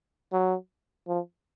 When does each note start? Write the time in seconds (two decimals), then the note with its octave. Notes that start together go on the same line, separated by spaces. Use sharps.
0.32 F#3
1.08 F3